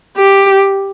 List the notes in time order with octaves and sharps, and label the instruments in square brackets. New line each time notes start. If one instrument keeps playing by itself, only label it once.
[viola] G4